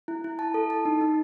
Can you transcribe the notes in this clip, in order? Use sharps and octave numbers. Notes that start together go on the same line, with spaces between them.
E4
E4
A5
A4
A5
D#4
D#4